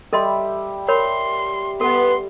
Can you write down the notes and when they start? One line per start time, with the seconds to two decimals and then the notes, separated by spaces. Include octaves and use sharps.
0.13 G3 A4 D#5 E5 C6
0.88 A#4 C#5 B5 C6
1.81 B3 A4 C6